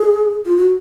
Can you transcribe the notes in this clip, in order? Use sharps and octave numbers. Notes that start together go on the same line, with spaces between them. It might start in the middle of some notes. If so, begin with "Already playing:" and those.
Already playing: G#4
F4
F#4